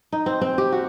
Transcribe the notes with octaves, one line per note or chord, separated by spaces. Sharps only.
D#4
C4
C4
G4
F#4